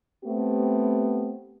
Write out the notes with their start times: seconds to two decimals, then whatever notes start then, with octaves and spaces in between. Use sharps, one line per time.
0.25 A3 B3 C4 G4